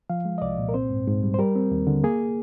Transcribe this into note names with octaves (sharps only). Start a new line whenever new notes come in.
F3 F5
G#3
D#5
C2 D5
A#2
A#4
C4 C5
G#2
G#2
G3
C5
G3 A#4
C4
D#2
D3
A#3 G#4